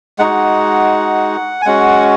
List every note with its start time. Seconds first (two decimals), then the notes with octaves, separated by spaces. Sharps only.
0.19 G#3 D#4 F#4 F#5
1.62 G#5
1.65 G#3 C#4 F#4 F#5